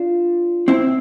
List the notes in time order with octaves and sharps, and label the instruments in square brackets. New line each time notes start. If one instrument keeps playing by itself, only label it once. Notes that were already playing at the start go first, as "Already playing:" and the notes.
Already playing: [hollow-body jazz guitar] D4 F4
C4 E4